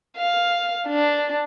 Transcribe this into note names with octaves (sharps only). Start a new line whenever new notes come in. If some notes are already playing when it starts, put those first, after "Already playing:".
F5
D4